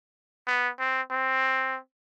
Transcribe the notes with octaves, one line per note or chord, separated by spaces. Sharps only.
B3
C4
C4